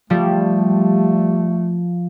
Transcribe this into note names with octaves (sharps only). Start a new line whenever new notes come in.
F3 G3 A3